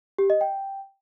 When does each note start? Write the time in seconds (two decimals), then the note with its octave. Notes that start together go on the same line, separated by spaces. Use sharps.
0.18 G4
0.30 D#5
0.41 G5